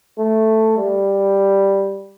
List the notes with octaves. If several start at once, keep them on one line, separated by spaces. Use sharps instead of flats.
A3
G3